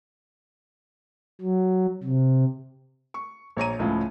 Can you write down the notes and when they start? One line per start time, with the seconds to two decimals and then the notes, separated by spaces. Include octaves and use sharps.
1.41 F#3
2.03 C3
3.14 C#6
3.57 A#1 C#5 A#5 D#7
3.79 C#2 A2 C#3 F3